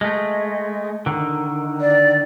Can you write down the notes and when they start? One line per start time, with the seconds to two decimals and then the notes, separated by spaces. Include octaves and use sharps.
0.01 G#3 A3
1.06 D3 D#3
1.81 D5